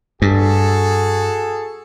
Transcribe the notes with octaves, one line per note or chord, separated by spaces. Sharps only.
G2 F#4 G#4 A4